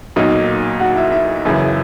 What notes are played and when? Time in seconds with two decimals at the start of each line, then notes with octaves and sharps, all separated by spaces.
0.16 B1 A#2 F#3 A#3 D#4 D#5
0.80 F#4 F#5
0.96 E4 E5
1.11 E4 E5
1.44 F#1 F#2 C#3 E3